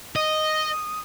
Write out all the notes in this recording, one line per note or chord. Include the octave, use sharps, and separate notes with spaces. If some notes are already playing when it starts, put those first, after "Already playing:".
D#5 D#6